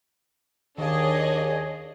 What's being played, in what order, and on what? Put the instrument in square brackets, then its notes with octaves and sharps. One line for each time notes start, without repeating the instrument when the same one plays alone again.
[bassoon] D#2 [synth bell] D#3 F5 [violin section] D4 C#5 D#5 [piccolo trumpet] G#4